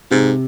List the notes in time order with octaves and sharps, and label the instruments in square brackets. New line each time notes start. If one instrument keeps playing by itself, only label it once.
[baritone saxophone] G#2 [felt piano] C3